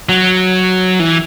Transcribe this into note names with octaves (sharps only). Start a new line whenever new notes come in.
F#3
E3